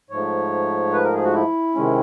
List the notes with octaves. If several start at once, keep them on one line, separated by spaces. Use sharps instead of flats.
G#2 F3 A3 C#5
B4
A#4
G#4
F#4
E4
C3 D#3 G#3 C#4